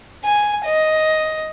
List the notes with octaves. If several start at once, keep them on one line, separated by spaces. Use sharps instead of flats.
G#5
D#5